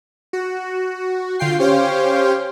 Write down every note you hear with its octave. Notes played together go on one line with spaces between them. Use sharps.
F#4
D3 F4 G5 C7
C#4 G4 C5 C#5 F5 G5